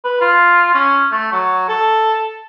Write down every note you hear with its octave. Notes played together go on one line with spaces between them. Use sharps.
B4
F4
C#4
A3
F#3
A4